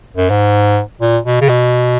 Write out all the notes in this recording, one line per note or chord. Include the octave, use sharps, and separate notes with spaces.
F#2
G#2
A#2
B2
C#3
B2